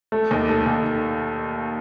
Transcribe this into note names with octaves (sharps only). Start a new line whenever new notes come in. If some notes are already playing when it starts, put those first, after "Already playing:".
A3
D#2
A3
D#2